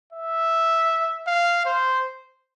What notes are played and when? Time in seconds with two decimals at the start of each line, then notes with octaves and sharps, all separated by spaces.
0.13 E5
1.27 F5
1.66 C5